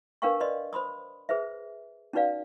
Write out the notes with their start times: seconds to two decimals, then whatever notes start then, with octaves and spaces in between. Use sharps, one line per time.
0.22 D4 A#4 B4 F5 G5 C#6
0.40 B4 D5 D#5 C6
0.73 C5 B5 C6 D#6
1.29 G#4 B4 C5 E5
2.13 C#4 D#4 F#4 B4 D5 F5